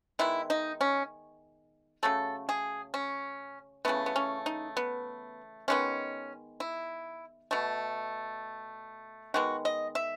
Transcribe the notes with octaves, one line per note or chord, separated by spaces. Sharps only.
D#3 G#3 B3 E4
D#4
C#4
C#3 F#3 A3 A4
G#4
C#4
C#3 E3 A3 B3
B3
C#4
D#4
B3
D#3 G#3 B3 C#4
E4
B2 A3
D#3 G#3 B3 F#4
D#5
E5